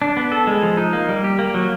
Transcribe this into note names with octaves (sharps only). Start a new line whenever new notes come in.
D4
B3
A4
G#3
F3
D#4
A#3
G3
G4
A#3
F#3